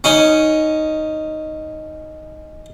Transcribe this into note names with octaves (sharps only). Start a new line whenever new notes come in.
C#4 D#4